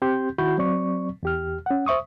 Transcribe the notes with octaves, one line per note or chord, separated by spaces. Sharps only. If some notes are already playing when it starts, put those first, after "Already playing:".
C4 G4 C6 G6
D#3 E4 F#4 B5 C#6 G6
F#3 C4 D5 C#6
E2 G4 F6
C#4 F#5
C5 E5 C#6 D#6